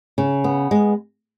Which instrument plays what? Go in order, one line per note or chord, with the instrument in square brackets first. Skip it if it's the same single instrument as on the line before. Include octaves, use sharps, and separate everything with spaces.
[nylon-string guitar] C#3
B3
G#3